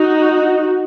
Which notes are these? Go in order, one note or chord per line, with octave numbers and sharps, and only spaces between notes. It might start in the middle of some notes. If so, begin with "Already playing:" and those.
Already playing: D#4 F#4